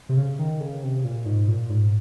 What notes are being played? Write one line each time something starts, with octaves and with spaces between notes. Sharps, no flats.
C3
C#3
D#3
C#3
C3
A#2
G#2
A#2
G#2